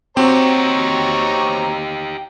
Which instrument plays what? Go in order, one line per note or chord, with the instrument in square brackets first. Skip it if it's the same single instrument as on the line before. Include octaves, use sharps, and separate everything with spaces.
[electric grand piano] C4 F#4 [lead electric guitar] D#4 G4 [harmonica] C#5 A#5